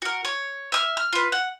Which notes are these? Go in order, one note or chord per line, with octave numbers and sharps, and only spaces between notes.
F#4 A#4
C#5
E5 D#6 F6
F6
F4 B4
F#5